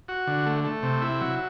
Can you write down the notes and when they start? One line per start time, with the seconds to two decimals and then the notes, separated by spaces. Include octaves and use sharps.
0.08 F#4
0.27 D3
0.46 A3
0.64 A3
0.83 C3
1.02 E4
1.21 F#3